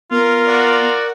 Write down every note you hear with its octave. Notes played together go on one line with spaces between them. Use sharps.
B3 F4 A#4
F#4 D5